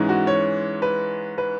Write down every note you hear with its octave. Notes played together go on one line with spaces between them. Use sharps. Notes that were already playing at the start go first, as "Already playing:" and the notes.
Already playing: G#2 E3 G#3 C#4
F#4
C#5
B4
B4